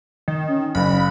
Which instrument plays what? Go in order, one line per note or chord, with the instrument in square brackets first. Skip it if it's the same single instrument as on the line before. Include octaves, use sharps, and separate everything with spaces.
[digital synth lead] D#3
[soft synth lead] C#4
[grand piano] F#1 [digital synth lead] B5